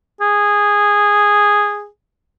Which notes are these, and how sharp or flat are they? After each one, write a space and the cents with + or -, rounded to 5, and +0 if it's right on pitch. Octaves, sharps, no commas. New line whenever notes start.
G#4 -10